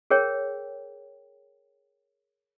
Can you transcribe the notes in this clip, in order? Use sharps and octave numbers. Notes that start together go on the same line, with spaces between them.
G#4 A#4 C#5 G5